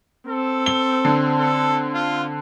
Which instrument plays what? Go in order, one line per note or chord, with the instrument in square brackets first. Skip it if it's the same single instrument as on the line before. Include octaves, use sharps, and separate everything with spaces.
[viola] C4 [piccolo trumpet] A4
[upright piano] G7
D3
[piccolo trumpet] A4
F4